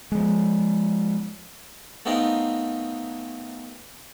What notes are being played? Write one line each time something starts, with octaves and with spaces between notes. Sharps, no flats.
F3 G#3
A3 B3 C4 D#4 F4 A#4